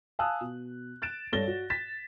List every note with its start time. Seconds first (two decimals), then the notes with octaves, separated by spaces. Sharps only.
0.19 F5 G#5 A5 D#6 E6 F#6
0.41 B2
1.02 F#6 A6 D7 E7
1.33 G2 A4 C#5 A6 A#6 G7
1.47 F#4
1.70 A6 B6 E7